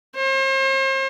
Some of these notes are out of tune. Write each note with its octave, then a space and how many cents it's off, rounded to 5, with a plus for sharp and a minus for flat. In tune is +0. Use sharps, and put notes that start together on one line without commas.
C5 +40